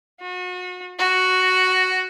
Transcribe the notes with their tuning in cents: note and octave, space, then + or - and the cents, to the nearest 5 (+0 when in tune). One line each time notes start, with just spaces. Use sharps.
F#4 -35
F#4 +0